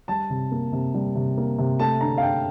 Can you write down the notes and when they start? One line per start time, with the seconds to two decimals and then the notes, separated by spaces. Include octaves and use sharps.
0.08 G3 A5
0.30 C3
0.51 A#3
0.72 C3
0.94 G3
1.15 C3
1.37 A#3
1.58 C3
1.79 A3 A5
2.01 D3 A#5
2.18 F5
2.22 D3 G5